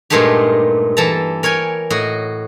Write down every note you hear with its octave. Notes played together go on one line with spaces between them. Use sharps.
G2 A#2 G#3 A3 D#4 G4
E3 A4 A5 A#5
A#4 C#5 G5 G#5
A2 F#4 D#5